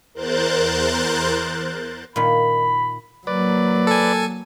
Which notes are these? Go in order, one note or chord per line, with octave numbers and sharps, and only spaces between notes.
E2 A#4 C5 F#6 G6 A6
A#2 D#3 B5
F#3 A#3 B4 D5
A4 G#5